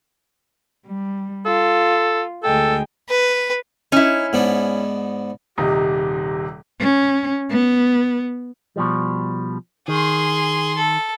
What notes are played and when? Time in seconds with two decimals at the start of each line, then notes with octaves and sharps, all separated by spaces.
0.85 G3
1.46 F4 A4
2.43 D2 G#3 A4 G5
3.09 B4
3.92 C#4 D#4 E4
4.33 G#2 B3 D4
5.58 D#1 C3 D#4 G4
6.80 C#4
7.50 B3
8.76 B2 F3 G3
9.88 D#3 G#4 C6
10.77 A4